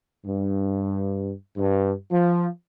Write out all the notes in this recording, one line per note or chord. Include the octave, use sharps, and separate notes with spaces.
G2
G2
F3